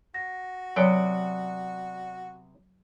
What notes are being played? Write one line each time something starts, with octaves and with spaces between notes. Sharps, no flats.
F#4 A#6
C3 F#3 B3 A#4 C#5 D5 G5 G#5